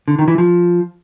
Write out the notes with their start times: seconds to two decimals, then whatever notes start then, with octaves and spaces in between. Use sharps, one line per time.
0.08 D3
0.19 D#3
0.28 E3
0.38 F3